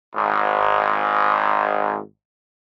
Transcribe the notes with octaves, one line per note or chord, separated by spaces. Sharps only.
G#1 G#2